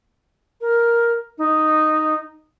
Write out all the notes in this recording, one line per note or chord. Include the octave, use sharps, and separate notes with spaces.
A#4
D#4